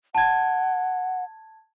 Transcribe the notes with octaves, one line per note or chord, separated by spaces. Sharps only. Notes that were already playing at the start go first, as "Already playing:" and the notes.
F#5 A5 G#6